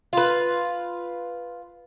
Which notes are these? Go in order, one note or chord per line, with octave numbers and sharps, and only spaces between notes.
F4 B4